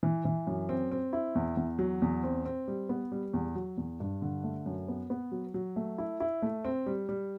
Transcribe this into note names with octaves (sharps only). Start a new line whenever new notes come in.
E3
E3
F#2
C4
C4
E4
E2
E2
F#3
E2
C4
C4
G3
B3
G3
E2
F#3
E2
G2
D3
A3
F#2
B3
B3
F#3
F#3
A3
E4
E4
A3
C4
G3
G3